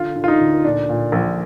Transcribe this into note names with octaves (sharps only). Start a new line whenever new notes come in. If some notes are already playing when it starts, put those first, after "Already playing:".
Already playing: D3 F4
D3
F4
D#4
D2
A#2 D4
A#2
A#1